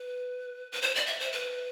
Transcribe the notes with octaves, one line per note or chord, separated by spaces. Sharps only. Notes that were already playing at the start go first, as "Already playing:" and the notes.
Already playing: B4
B4
C5
D5
E5
C5
B4